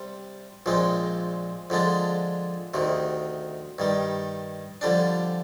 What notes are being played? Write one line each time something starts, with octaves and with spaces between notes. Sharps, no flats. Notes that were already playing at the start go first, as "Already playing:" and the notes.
Already playing: C3 G3
A#1 A#2 G#3 C4
F2 D3 G#3 D4
D2 C3 D#3
G2 D#3 G3
F2 D3 G3 D4